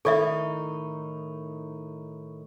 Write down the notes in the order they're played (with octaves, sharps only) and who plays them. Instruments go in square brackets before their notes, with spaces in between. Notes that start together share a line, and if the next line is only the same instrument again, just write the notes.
[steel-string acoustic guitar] A2 D#3 D#4 [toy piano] A4 D5 E5 [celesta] B5 C#6